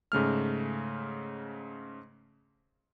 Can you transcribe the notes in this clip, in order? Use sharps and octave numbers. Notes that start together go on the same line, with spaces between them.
G#2 C#3 A3 F6